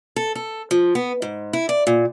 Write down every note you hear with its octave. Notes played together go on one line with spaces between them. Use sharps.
A4
A4
F3
B3
G#2
E4
D5
A#2